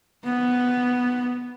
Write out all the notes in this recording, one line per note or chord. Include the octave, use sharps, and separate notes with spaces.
B3